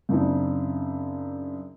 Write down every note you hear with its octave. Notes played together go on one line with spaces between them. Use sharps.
F#2 C#3 C4 D4 D#4